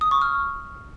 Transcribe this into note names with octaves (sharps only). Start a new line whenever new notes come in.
D#6
C#6
F6